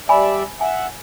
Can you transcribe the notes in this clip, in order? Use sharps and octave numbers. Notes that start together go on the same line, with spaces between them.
G3 D5 E5 G#5 B5
E5 F#5 G#5